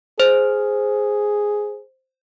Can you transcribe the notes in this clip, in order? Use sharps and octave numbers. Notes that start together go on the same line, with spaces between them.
G#4 C5